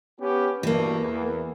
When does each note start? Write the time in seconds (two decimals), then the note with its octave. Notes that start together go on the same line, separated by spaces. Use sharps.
0.20 B3 C#4 G4
0.63 G2 B2 E3 A3 A#3
1.01 E2